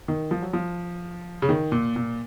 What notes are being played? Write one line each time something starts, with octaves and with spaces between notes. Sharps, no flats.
D#3
F3
F#3
F3
C#3
D#3
A#2
A#2